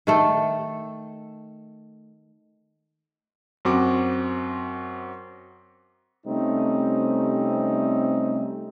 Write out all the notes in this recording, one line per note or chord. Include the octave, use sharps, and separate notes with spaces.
D#3 A3 A4
F#2 C4 F#4 D6
C3 G3 A3 C4 C#4 D#4